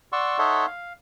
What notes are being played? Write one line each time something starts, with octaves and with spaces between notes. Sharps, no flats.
D5 F#5 C6 C#6 E6
D#4 A4 C#5 E5 F#5 C6
F5